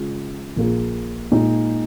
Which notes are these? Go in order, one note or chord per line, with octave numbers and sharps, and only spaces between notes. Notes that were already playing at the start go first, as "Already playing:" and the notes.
Already playing: C#3 G#3 F4 G#4
A#1 A#2 A#3 F4 G#4
A#2 G#3 D#4